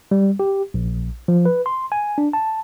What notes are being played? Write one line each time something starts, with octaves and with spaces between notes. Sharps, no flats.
G3
G4
A#1
F3
B4
C6
G#5
D4
A5